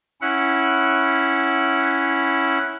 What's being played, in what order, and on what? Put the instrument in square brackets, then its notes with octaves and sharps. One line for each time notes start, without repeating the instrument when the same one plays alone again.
[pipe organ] C#4 E4 F#5